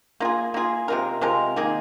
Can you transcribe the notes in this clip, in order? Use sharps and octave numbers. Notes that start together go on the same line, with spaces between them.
A#3 F4 G#4
A#3 F4 G#4
C3 G#3 F4 A#4
C3 G#3 F4 A#4
D#3 A#3 G#4